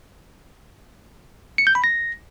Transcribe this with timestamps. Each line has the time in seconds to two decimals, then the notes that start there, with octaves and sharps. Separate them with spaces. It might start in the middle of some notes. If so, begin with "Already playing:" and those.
1.58 C#7
1.67 G6
1.75 B5
1.84 A#6